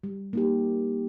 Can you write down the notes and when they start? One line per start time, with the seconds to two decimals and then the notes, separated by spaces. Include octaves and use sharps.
0.03 G3
0.33 A#3 D#4 G4